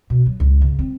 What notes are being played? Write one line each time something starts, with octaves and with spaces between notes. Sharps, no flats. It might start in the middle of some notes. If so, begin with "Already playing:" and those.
B2
F#3
C#2
C#3
C4